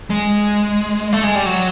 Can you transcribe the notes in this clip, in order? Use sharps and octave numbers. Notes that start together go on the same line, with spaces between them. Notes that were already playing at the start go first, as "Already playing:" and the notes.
G#3
A3
G#3
G3
F#3